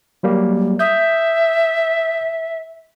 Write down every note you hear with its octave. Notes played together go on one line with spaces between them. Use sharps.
F#3 G3 A#3
E5 D#6 G6